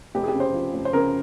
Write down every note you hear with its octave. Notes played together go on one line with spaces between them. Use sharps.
F1 G4
G#4
G4
C#3
C5
F3
F1
C5
C#3 A#4